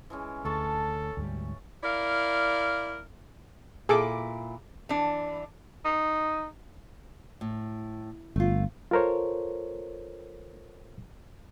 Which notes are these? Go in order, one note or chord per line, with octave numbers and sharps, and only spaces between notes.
E3 G#3 C#4
D2 A4 C#5 A5 C#6
D2 G#2 G3
E4 A#4 D5 F5
A#2 E4 G#4 A4 D6
E3 D4
D#4
A2
G1 A3 F4
F4 A4 A#4 C5 C#5